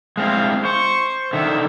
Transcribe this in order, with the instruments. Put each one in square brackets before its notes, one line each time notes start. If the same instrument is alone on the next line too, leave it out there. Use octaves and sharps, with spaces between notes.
[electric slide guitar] G#3 C4 E4 [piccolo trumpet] F5
[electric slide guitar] C5 [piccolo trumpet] C#6
[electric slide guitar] D3 D#3 [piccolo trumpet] E5